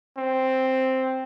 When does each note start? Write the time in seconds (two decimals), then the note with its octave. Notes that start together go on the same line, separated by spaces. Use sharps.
0.18 C4